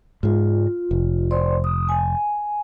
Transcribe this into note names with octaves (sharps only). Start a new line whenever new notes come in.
G#2 G#3 F4
F1
C5 D5 C6
D#6
G#5